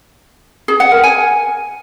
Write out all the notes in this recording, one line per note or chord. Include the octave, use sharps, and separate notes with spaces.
G#4
F#5
A#4
G#5